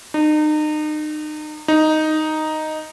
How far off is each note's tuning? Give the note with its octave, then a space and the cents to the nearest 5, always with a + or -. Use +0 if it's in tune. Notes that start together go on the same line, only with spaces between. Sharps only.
D#4 -35
D#4 +0